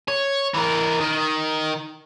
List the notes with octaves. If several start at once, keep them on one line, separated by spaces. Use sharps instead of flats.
C#5
E3 A#4
D#3